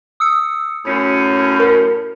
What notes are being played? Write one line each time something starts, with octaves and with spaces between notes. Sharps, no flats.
D#6 E6 C#7
F#2 A2 C#4
A#4